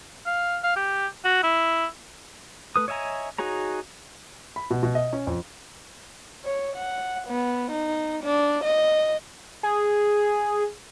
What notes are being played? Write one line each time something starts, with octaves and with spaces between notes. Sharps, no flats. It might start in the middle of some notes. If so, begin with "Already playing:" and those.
F5
F5
G4
F#4
E4
A3 B4 D#6
C#5 D#5 E5 G#5 A#5
D#4 F#4 G#4 C#5 A#5
B5
B2
B2
D#5
C#4
F2
C#5
F#5
B3
D#4
D4
D#5
G#4